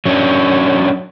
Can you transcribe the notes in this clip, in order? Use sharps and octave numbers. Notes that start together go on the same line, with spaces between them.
F#3 C#4 D4